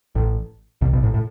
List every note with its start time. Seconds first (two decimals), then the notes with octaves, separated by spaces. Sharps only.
0.15 A1 A2
0.81 C2 C3
0.92 B1 B2
1.03 A1 A2
1.14 A2